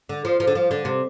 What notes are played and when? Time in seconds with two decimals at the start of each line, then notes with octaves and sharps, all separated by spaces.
0.09 D3
0.25 F3
0.40 F3
0.47 D3
0.55 F3
0.71 D3
0.85 C3